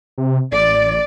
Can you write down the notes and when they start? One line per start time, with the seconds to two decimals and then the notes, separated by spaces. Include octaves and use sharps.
0.18 C3
0.52 A1 D5